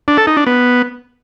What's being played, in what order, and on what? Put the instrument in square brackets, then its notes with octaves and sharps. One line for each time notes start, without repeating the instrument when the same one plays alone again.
[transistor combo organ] D4
A4
D#4
D4
B3